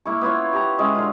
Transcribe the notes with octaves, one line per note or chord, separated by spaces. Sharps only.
A#3 E4 C#6
B3 E4 F4 C#5
G4 A#5
G#3 C#4 E5 F#5
D3 F4